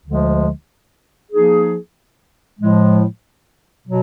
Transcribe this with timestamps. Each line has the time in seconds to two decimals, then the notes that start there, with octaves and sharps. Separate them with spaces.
0.05 D2 D3 F3 G#3
1.31 F3 A#3 D#4 G#4
2.60 A2 F3 G#3
3.87 B2 F#3